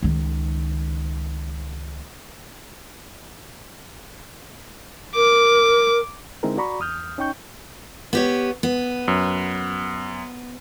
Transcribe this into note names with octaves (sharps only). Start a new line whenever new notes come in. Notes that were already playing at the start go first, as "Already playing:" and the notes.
C#2 D#3
A#4 D6
D3 G#3 C4 D#4 E4 A#4
F#4 D5 A#5 B5 C#6
E2 D#6 F6 G6
C#4 D#4 G5 C#6 G6
B3 G4 C#5
B3
F#2